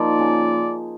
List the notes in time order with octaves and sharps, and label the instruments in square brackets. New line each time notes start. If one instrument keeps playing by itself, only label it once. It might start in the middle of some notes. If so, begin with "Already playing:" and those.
Already playing: [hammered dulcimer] F3 A#3 D#4 [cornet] D5
[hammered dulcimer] C#3